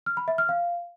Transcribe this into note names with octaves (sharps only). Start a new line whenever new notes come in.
F6
B5
E5
F6
F5